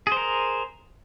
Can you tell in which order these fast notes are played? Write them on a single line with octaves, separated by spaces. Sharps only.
G#4 C5 A#4